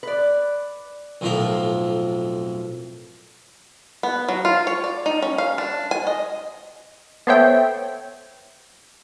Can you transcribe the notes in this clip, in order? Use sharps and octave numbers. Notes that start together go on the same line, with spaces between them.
B4 D5
B1 F2 A2 F3 A#4
B3
F#3
F4
C#5
D5
D#4
C#4
F5
D4
G#5
D#5
B3 A4 C5 C#5 E5 G5